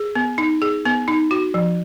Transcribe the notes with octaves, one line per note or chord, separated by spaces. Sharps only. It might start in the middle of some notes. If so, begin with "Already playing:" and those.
Already playing: G#4
B3
D#4
G#4
B3
D#4
F#4
F3